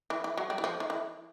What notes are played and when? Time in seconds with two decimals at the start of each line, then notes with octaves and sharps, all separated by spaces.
0.10 E3
0.24 E3
0.37 F#3
0.50 G3
0.58 E3
0.64 F3
0.80 D#3
0.90 E3